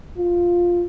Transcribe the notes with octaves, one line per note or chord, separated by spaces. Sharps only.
F4